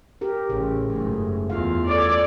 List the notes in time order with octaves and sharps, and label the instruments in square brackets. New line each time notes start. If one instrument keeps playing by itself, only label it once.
[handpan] G4 A#4
[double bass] A1 [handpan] C#3
[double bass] F#1 G#2 [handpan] A3
[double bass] E2 [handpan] F4 F5
[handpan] A4 C#5 [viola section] D5